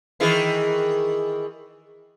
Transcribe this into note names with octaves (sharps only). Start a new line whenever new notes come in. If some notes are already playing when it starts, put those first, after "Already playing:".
D#3 E3 G#4